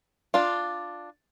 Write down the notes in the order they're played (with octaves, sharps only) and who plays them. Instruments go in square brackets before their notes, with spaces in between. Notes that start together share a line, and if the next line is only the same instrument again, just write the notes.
[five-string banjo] D4 F4